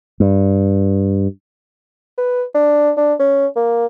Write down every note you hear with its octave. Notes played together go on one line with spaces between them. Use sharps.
G2
B4
D4
D4
C#4
A#3